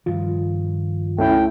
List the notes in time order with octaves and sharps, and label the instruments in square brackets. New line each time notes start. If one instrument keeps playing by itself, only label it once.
[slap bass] G2 D#3 F3 [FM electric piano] F4
[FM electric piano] C#2 [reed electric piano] A3 C#4 E4 [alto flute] G5